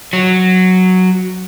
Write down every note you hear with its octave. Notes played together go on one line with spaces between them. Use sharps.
F#3